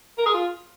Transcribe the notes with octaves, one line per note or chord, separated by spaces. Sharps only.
A#4
G#4
F4